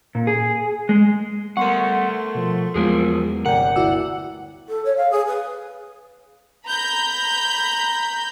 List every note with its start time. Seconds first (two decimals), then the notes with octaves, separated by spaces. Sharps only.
0.15 A#2
0.27 G#4
0.89 G#3
1.57 G3 A3 B3 A#4 F#5 C6 C#6
2.35 B2 F3
2.75 E2 F3 F#3 G#3 B3 F4 G#4 A#4
3.46 G1 C3 A#4 D5 F#5 G5
3.76 D2 E4 F#4 D5 E6
4.69 A4
4.85 C#5
4.97 F5
5.11 G#4
5.27 B4
6.66 A#5 B5 G6